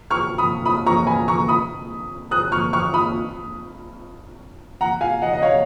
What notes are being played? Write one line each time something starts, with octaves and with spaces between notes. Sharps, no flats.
C#6 F6
B5 D#6
B5 D#6
A#5 C#6
G#5 B5
A#5 C#6
B5 D#6
D#6 F#6
C#6 F6
C#6 F6
B5 D#6
F#5 A#5
F5 G#5
D#5 F#5
D#5
C#5 F5